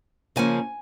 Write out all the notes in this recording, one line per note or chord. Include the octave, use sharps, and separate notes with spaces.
C#3 F3 A#3 C#4 G#5